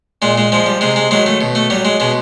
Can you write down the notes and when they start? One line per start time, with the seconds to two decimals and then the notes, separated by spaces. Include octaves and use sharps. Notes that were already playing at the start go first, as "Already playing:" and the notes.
0.22 A#2 G#3
0.38 G#3
0.52 F3 G#3
0.66 G3
0.81 C3 G#3
0.96 G#3
1.11 D#3 F#3 G#3
1.26 A3
1.41 B2
1.55 A3
1.70 F#3 G3
1.85 G#3
2.00 B2 G#3